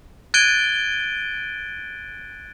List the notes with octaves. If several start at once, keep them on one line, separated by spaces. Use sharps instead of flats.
F#6 G#6 A6 D7 D#7 G7